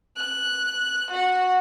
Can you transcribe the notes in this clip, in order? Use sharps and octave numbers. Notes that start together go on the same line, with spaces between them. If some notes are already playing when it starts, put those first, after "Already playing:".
F#6
F#4 F#5